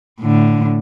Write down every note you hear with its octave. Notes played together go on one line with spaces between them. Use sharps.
A2 D3